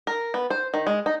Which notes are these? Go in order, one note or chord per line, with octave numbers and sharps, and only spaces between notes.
A#4
B3
C5
D#3
G#3
D#4